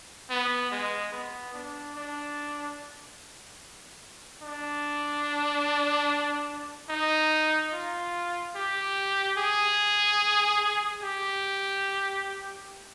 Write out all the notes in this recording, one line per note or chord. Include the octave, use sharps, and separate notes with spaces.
B3
G#3
B3
D4
D4
D4
D#4
F4
G4
G#4
G4